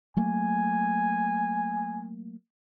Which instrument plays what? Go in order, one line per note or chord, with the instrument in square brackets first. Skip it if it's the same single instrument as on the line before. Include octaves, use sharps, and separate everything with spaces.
[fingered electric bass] F#3 A3 A#3 [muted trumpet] G#5